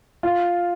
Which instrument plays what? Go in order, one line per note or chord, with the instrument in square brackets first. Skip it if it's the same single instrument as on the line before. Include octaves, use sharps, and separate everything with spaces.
[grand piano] F4